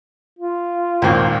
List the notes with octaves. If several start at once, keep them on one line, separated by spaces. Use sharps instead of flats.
F4
G#1 D#2 A#2 A#3 C4